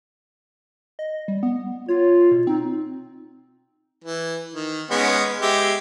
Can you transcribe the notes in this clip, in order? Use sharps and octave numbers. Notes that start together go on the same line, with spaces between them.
D#5
G3
B3
F4 C#5
B2
C4 D#4
E3
D#3
G#3 B3 C#4
G#3 G4 E5